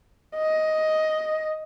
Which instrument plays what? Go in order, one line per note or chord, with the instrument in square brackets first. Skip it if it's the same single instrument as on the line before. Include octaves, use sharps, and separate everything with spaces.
[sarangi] D#5